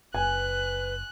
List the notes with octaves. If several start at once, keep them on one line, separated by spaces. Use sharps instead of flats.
F#1 B4 G#5 F#6